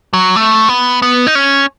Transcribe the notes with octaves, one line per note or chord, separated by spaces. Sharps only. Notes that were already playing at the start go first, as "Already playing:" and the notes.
F#3
A3
B3
B3
D#4
C#4